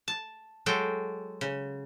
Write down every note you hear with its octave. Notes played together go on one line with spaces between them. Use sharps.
A5
F#3 G#3 A4 G5
C#3